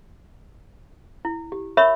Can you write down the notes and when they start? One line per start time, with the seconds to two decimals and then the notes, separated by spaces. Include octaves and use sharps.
1.25 E4
1.52 G4
1.77 A#4 C#5 E5 B5 C#6